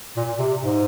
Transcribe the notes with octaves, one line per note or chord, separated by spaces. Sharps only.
A#2
C3
G#2